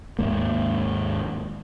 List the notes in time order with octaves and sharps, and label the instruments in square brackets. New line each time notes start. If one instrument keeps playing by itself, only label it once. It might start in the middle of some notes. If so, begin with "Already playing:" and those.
[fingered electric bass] D#2 G#2 A#3